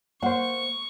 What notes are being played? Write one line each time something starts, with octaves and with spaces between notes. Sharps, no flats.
A#3 C5 F#5 C#6